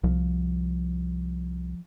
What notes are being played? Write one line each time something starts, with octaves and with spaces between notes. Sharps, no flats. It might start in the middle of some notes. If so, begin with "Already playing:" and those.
C2 F3